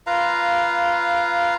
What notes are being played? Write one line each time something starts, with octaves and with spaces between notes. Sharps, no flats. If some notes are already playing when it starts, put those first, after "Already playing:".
F4 B4 F5 A#5